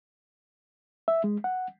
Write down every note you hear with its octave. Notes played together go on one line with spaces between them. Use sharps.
E5
G#3
F#5